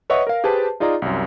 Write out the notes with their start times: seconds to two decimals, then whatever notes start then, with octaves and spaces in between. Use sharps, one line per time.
0.10 B4 C#5 D#5 E5 F#5 C#6
0.27 A#4 F5
0.44 G4 G#4 B4 C5 A5
0.80 D#4 F4 G#4 D5 D#5 A#5
1.02 C2 F#2